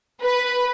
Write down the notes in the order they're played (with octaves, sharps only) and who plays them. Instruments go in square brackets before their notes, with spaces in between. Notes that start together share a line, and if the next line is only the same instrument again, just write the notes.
[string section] B4